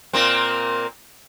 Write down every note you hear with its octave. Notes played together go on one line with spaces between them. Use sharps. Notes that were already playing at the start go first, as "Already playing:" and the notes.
A#2 A#3 C4